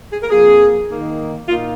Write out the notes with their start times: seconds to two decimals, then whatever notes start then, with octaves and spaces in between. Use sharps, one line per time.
0.11 G#4
0.22 A#4
0.30 F2 F3 A#3 G#4
0.88 D#3 A#3 D#4
1.48 A#2 A#3 D#4 F4